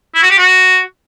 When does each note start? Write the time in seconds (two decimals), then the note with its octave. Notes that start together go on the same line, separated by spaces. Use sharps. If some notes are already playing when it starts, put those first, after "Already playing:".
0.15 E4
0.23 F#4
0.30 G4
0.38 F#4